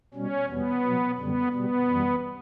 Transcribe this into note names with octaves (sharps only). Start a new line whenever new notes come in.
B2 G3 C#4
E2 B2 G3 B3
B2 F#3
F#2 D3 G3 B3
B2 G3 B3
F#2 E3 G3